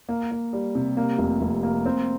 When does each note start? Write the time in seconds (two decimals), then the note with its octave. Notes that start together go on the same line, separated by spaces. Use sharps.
0.09 A#3
0.31 A#3
0.53 G3
0.75 C3
0.97 A#3
1.18 F1
1.41 F1
1.63 A#3
1.86 C4